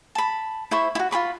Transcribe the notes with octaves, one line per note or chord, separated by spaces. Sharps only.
A5 B5
E4 C5 B5 C#6
E4 F#4
F4 G#4 B5 C#6